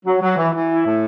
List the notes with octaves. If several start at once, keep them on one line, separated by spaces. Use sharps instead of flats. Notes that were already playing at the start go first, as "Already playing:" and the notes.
F#3
F#3
E3
E3
E4
A2